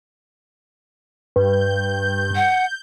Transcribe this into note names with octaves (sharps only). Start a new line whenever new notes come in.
G2 B4 G6
F#5